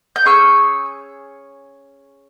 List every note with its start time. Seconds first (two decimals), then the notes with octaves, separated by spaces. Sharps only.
0.16 G6
0.25 C#4 G#4 C#6 E6